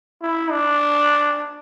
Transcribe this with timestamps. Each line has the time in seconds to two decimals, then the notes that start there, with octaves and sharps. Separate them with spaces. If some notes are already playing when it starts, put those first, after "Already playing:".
0.22 E4
0.51 D4